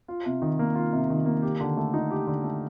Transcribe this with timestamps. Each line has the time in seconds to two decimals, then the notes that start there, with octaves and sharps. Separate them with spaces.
0.08 F4
0.26 C3
0.42 D#3
0.59 A#3
0.75 F4
0.93 C3
1.10 D#3
1.26 A#3
1.43 G4
1.60 D3
1.77 A3
1.94 D#4
2.11 G4
2.27 D3
2.44 A3